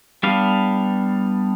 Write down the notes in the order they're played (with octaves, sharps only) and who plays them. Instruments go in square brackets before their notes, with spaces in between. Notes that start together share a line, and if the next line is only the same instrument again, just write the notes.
[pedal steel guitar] G3 B3 D4 F5